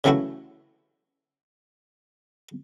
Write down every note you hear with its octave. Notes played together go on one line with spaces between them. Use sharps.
C#3 E3 F#3 A3 E4 F#4